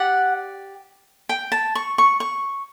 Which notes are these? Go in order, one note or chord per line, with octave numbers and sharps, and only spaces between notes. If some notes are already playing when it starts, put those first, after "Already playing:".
Already playing: G4 D5 F#5
G5
A5
C#6
C#6
C#6